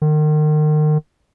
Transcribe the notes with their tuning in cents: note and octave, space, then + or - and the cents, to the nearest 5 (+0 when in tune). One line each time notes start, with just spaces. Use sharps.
D#3 -35